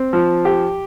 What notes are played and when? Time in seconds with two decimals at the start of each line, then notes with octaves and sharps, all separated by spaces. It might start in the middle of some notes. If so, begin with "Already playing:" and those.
Already playing: C4
0.13 F3
0.45 G4